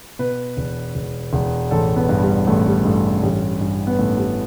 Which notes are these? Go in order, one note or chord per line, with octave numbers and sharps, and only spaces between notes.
B2 B4
E1
E1
E1
A1 A4
B3
G2
G3
A1 A3
G3
G2 A3
A1 G3
G2
B3
A1 A3
G3